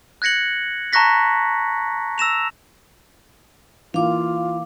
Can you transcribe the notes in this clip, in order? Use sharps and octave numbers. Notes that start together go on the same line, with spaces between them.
F#6 G#6 A#6 C#7 F#7
A5 A#5 C#6 F#6 A#6 B6
E6 A#6 E7 F7
E3 A#3 F4 F5 D6